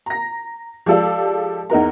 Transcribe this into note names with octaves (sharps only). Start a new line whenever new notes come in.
A#5 A#6
F3 G#3 G4 A4 D5 F5
E2 D#4 A#4 A#5